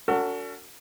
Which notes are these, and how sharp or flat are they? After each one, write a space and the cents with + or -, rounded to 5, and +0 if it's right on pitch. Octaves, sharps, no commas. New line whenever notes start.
D4 -40 F#4 +0 A4 +45